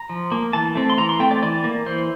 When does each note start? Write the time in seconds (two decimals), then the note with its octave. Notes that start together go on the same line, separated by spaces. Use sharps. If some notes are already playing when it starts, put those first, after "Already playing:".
Already playing: A#5
0.09 F3
0.32 A#3
0.53 E3 A5
0.75 A3 C4
0.90 C6
0.98 E3 A#5
1.09 C6
1.19 A3 C4 G5
1.31 D5
1.42 E3 D5
1.64 A#3
1.86 E3 C5